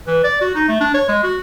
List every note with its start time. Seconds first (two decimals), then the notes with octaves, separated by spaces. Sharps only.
0.07 E3
0.24 D5
0.41 F#4
0.55 D#4
0.68 A3
0.81 D4
0.94 C#5
1.09 G#3
1.24 F#4